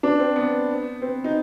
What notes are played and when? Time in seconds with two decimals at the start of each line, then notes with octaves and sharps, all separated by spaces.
0.03 D4
0.20 C4
0.36 B3
1.02 C4
1.24 D#4